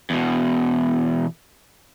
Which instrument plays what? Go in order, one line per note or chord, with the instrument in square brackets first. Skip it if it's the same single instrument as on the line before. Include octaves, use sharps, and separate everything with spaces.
[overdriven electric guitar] E2 B2